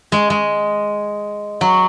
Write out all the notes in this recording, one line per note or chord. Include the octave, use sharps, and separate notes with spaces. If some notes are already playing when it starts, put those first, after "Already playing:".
G#3
G#3
F#3